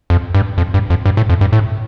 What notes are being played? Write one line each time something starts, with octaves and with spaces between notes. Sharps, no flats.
F2
G2
F2
G2
F2
G2
A2
F2
G2
A2